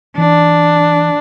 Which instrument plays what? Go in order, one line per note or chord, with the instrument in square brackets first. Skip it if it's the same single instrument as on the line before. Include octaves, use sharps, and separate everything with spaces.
[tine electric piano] E3 [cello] D4